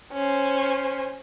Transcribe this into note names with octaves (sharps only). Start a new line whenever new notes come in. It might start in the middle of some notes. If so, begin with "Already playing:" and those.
C#4 C5